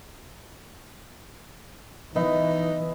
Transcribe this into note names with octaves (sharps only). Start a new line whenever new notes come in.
E3 B3 D#4 D#5 E5